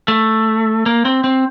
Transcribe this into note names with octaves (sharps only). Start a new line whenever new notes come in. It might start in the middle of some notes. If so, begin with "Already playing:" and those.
A3
A#3
C4
C4